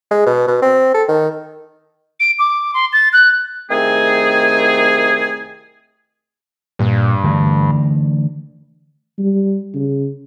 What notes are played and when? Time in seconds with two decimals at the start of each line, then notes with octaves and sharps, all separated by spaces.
0.11 G#3
0.26 B2
0.48 B2
0.62 C4
0.94 A4
1.08 D#3
2.20 D7
2.39 D6
2.74 C6
2.93 A6
3.13 F#6
3.71 C2 D#3 A3 C4 G#4
6.79 G2 A#2
7.24 D3 E3 A3
9.18 G3
9.74 C#3